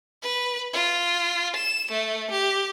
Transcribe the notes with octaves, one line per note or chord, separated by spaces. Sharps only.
B4
F4
E7
A3
G4